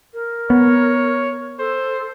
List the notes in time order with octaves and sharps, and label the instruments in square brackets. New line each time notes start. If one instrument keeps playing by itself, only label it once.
[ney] A#4
[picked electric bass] B3 [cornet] C#5
[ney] A4 [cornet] C5